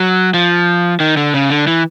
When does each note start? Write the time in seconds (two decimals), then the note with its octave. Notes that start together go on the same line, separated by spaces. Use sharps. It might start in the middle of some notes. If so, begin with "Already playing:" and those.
Already playing: F#3
0.34 F3
1.00 D#3
1.17 D3
1.34 C#3
1.50 D3
1.67 E3